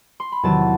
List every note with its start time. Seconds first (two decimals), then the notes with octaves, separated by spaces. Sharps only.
0.20 C6
0.32 B5
0.43 E2 C3 D#3 F#3 A5